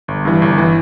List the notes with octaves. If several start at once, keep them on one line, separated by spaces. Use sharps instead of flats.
G1
G2 E3
G1
E3